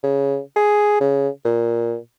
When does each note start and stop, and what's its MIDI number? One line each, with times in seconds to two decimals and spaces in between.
0.03 0.39 49
0.56 0.97 68
1.01 1.29 49
1.45 1.96 46